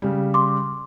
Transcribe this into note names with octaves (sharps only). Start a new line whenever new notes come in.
C#3 G3
C6 D6